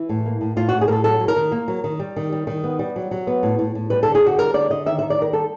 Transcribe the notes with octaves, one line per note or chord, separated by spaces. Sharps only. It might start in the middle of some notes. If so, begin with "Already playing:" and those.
Already playing: E3 E4
A2
A#3
A2
A2 F4
A2 F#4
G#4
A2 A4 A#4
F#3 A4
F#3
A#4
D#3
A#3
F#3
D#3
G3
D#3
G3
D#3
B3
G3
F#3
F#3
B3
A2
A2
A2
G3 B4
D3 A4
G#4
D3 F#4
G3 A#4
D3 D5
D3 D#5
D#3 E5
D#3 E5
D5
D#3 A#4
G3 A4